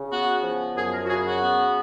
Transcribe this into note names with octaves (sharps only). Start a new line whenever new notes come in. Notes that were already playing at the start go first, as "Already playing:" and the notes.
Already playing: C#3
B3 F#4
F3
F#2 G#4
A#4
F#4
C#3 G#4
F#4
B3